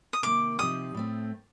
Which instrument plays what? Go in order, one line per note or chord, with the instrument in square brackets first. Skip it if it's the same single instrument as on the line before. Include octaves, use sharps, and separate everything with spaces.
[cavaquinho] D#6
[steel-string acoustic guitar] C3 D#3 A#3 [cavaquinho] D6
[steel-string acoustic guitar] C3 F3 C4 D#4 G4 [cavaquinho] D#6
[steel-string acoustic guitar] A2 A3 C4